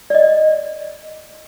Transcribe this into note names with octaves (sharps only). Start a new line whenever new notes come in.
D5 D#5